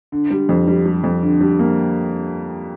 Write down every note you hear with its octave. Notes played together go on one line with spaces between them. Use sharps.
D3
G3
F2
G3
G3
F2
D3
G3
A#3